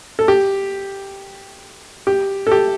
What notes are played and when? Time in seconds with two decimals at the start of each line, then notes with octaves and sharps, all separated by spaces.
0.19 A4
0.28 G4
2.07 G4
2.47 A4
2.52 G4